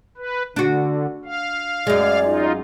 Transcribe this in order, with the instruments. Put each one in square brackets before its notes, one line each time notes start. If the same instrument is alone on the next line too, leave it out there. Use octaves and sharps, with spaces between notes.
[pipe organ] B4
[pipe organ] D3 [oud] D4 F#4
[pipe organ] F5
[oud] F#2 G#3 [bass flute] D5
[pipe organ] D#4 F4